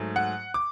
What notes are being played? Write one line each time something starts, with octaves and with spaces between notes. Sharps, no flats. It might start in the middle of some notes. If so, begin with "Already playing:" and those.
Already playing: G#2 F#3 A3
F#5
D6